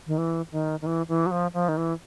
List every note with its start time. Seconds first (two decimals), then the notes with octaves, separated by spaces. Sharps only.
0.07 D#3
0.18 E3
0.52 D#3
0.81 D#3
0.86 E3
1.09 E3
1.26 F#3
1.31 F3
1.54 F3
1.69 D#3
1.77 E3